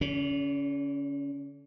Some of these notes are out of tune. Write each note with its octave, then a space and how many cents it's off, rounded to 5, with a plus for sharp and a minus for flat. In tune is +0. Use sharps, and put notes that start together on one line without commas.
D3 -40 C#4 +20